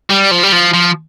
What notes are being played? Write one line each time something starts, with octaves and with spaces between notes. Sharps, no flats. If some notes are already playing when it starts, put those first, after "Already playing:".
G3
F3
G3
F3
F3